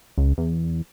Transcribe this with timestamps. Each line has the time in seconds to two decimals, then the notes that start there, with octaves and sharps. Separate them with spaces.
0.18 C#2
0.38 E2